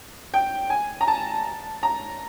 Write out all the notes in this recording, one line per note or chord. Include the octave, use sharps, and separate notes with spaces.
G5
G#5
A#5
A5
A#5